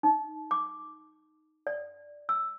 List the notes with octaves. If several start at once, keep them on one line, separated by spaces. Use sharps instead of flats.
D#4
D6
D5
E6